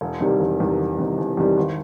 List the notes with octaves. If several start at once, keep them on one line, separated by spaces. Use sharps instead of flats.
E1
E2 C3 D#3 G3
E1
E2 C3 D#3 G3
E1
E2 C3 D#3 G3
E1
E2 C3 D#3 G3
G#1